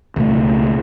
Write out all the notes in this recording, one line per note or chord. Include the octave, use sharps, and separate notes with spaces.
C#2 B2 A3